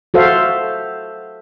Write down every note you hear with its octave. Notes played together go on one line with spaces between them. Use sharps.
F#4 A4 C5 E5 F5